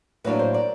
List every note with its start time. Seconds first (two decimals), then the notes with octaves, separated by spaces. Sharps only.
0.24 A2 F#3 A#3 D4 B4
0.39 C5
0.54 D5